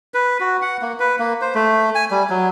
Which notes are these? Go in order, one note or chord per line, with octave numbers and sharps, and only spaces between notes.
B4
F#4
F#5
A#3
B4
A#3
C5
A3
G#5
G3
F#3